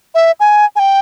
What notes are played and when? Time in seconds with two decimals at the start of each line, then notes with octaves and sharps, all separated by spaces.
0.15 E5
0.40 G#5
0.76 G#5
0.79 G5